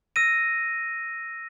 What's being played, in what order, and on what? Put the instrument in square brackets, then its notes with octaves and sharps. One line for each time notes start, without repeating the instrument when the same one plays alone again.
[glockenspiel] E6 A#6 D#7